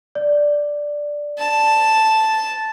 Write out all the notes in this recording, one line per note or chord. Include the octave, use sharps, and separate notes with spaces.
D5
A5